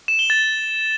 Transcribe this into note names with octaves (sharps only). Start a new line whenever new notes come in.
E7
G7
A6